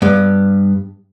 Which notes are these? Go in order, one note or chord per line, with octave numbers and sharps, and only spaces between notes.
G2 B3